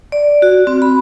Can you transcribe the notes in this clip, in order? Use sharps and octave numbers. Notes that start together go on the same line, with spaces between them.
D5
F#4
C4
B5